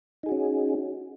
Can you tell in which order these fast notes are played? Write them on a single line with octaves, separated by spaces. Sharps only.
D#4 G#4 F#4 C#4